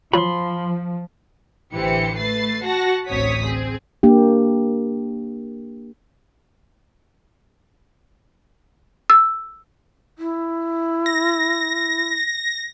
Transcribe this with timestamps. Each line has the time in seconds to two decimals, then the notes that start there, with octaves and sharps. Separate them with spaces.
0.13 F3 F#3 F4 B5 C6
1.73 A1 D3 E3 G4 C5 C#7
2.17 A3 B4 A6 C7
2.63 F#4 F#5 A5 A#6
3.08 A1 D2 C4 C#5 D#6 B6
3.43 C4 G#4
4.03 A#3 D4 G4
9.10 E6
10.18 E4
11.06 A#6